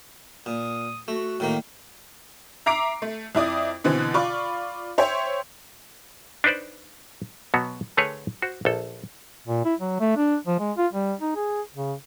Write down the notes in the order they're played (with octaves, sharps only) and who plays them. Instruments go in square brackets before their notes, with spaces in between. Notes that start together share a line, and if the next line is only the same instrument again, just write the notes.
[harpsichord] A#2 [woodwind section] D#6
[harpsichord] A3 [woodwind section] F#4
[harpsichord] A2 D#3 A#3
[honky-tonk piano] E5 A#5 D6 C7 D7
A3
F2 E4 D5 D#6
B2 D3 E3 C4
F4 D5 B5 C#6
C5 C#5 E5 G5
[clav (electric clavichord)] D4 D#4 B4 C5 D5
B2 F#3 B3 F#4
D3 A3 G#4 A#4 B4 C#5
F#4 C5
A#1 A4
[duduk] A#2
E4
F#3
A3
D4
F3
G#3
F4
G3
D#4
G#4
C#3